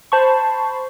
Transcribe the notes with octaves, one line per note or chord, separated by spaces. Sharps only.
C5 A5 B5 C#6